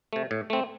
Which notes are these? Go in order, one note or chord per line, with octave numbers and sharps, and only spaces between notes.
C3 A3
A2
A3 C4